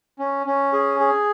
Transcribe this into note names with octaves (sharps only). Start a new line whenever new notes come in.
C#4
C#4
G#4
G#4